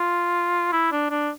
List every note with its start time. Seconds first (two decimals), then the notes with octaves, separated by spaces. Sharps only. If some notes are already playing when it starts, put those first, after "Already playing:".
Already playing: F4
0.72 E4
0.92 D4
1.10 D4